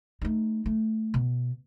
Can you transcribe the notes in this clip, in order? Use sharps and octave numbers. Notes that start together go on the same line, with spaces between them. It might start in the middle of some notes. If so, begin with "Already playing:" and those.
A3 D#4
A3
B2